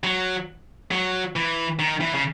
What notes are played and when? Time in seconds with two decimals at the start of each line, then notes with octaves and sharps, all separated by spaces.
0.04 F#3
0.91 F#3
1.36 E3
1.79 D#3
2.01 E3
2.14 C#3